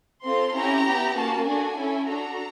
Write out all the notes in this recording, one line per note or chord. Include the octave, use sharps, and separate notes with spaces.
C4 F4 A4 C6
C#4 E4 G4 A#5
B3 E4 G4
A#3 C#4 F#4 A5
D4 F#4 A4 G#5
C#4 E4 A4
D4 F#4 A4 A#5